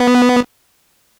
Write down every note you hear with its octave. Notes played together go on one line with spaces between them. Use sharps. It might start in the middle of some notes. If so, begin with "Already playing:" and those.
Already playing: B3